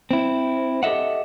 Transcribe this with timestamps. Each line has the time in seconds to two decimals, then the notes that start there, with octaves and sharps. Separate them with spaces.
0.11 C4 E4
0.83 G4 A4 D#5 E5 F#5